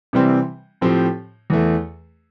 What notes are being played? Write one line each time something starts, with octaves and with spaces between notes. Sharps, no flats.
C3 E3 G3 C4
A2 F3 C4 G4
E2 E3 A3